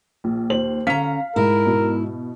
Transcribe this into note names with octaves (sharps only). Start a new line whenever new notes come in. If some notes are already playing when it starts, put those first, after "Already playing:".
A#1
D#2 C5 F#7
D3 C#4 F5 A#5 B6
G#2 E4 A#4
B2